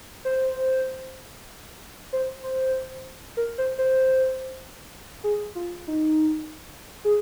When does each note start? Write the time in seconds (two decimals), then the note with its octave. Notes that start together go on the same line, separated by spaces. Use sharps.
0.25 C5
2.13 C5
2.43 C5
3.37 A#4
3.58 C5
3.78 C5
5.24 G#4
5.55 F4
5.87 D#4
7.05 G#4